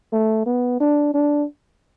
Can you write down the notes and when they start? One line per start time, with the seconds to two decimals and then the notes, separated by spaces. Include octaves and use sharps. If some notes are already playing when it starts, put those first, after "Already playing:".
0.13 A3
0.46 B3
0.80 D4
1.14 D4